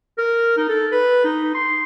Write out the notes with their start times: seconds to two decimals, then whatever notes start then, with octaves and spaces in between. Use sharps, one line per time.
0.18 A#4
0.57 D#4
0.69 A4
0.92 B4
1.25 D#4
1.55 C6